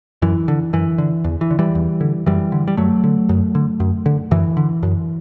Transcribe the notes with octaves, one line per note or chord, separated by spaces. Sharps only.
F#2 E3
D3
F#2 E3
D3
E2
E3
D3
E3 G3
E2
D3
F#2 E3 G3
D3
G3
F#2 F#3 A3
D3
F#2
D3
F#2
D3
F#2 E3
D3
F#2